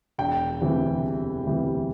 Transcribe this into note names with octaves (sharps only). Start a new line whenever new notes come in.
E1 G5
D2 C3 E3 G3
E1
D2 C3 E3 G3